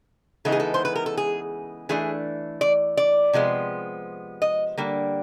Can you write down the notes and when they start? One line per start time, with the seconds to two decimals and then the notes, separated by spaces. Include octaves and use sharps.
0.45 C#3 E3 G#3 B3 D#4 A4
0.52 G#4
0.60 A4
0.74 C5
0.85 B4
0.96 A#4
1.06 A4
1.17 G#4
1.89 E3 A3 D4 G#4
2.61 D5
2.97 D5
3.33 C3 F3 G#3 B3
4.42 D#5
4.78 D3 G3 A#3